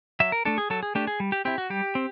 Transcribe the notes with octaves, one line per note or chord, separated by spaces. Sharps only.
F#3 E5
A#4
A3 D4 A4
G#4
F#3 A4
G#4
A3 D4 G4
G#4
G3
G4
C4 E4 G4
F#4
G3 G4
C4